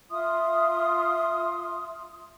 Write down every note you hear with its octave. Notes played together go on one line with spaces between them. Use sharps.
F4 E5 C6 D#6